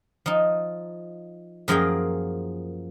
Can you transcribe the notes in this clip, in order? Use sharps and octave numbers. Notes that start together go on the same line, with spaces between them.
F3 D#4
F#2 F3 A#3 G#4 G5